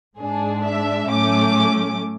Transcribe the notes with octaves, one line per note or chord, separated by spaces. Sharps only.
G#2 G#3 D4 G#4
E5
A2 F#3 A3 C#4 D6